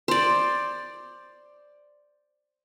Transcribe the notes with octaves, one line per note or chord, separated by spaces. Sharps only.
C5 D5